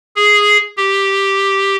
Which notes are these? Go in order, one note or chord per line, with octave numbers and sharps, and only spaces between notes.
G#4
G4